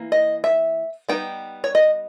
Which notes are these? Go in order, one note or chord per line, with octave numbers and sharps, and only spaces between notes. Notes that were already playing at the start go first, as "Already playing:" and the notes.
Already playing: E3 A#3
D#5
E5
G3 B3 D#4 G5
C#5
D#5